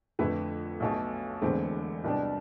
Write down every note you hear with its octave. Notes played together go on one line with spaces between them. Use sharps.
F2 D3 A3 E4 B4
B1 B2 A3
E1 E2 D3 A3 C4
C2 B2 G3 D4